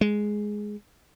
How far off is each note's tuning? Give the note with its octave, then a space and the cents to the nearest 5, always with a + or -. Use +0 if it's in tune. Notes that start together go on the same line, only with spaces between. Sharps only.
G#3 +5